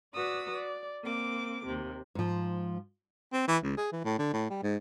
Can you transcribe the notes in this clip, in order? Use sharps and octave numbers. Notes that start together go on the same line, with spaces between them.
F#4 B4 D5 D#6 E6
D5
A#3 C4 D6
D#2 C3
G#2 F3
C4
E3
C#2
G#4
E3
A2
D3
A2
G3
G#2